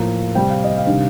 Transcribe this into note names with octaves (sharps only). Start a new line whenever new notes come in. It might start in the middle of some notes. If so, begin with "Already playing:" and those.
Already playing: A2 F3 A#3 A#5
C3 G3 C4 G5
F5
D#5
F5
C3 D#3 G3 D4